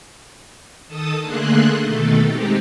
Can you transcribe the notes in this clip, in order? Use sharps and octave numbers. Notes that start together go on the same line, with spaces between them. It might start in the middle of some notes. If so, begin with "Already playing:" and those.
D#3 A4 A5 D#6
D3 A3 A#3 G#4 C6 F#6
B2 D#3 A3 A4
G#3 C4 D#4 G4